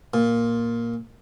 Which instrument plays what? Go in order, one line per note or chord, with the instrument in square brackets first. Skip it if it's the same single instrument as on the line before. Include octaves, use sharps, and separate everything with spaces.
[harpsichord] A#2